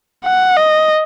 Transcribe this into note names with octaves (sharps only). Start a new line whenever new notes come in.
F#5
D#5